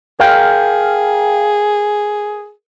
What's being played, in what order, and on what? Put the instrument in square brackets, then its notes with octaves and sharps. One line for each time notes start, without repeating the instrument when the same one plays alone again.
[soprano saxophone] G#4 [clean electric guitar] A#4 F5 G5